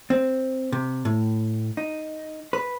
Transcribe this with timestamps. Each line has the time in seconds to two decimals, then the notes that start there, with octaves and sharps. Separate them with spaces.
0.10 C4
0.72 C3
1.05 A2
1.77 D#4
2.53 B4